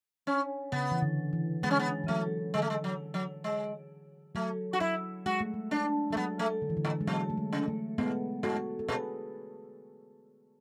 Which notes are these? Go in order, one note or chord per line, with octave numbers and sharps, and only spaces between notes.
C#4
C#3 B3
E3
D3
E3
G#3 B3
C#4
B3
E3
F#3 A3
D3 G#3
A3
G#3
F#3
F#3
G#3
F#3 A3
F#4
F#3 E4
G#3 F#4
A3
G#3
D4
G#3 A3
F#3 B3
A3
D3
E3
D3
A2
G#3
B2 F#3
A3
G#3
C#3
A3
G#2 G#3 B3
G#2 F#4 A4
A4
B2 G#4 B4